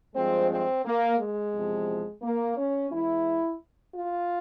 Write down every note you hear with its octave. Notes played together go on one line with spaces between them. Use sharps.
G2 F3 G#3 C4
C4
A#3
G#3
E2 C3 F3
A#3
C#4
E2 E3 G#3 E4
F4